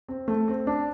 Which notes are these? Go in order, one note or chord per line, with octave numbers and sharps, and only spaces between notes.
C4
A3
C4
D4